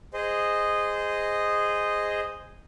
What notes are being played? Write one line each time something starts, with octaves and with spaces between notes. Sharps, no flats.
G#4 C5 D#5